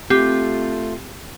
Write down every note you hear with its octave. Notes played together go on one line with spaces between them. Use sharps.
A3 C4 F4 G4